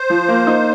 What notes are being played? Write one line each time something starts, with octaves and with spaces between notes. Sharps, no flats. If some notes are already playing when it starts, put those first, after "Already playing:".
Already playing: C5
F3
A#3
D#4